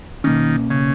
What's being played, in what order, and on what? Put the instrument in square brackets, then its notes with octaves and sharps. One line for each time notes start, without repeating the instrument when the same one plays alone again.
[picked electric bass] B2 A#3 C#4 [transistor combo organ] D#3
[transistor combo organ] C#3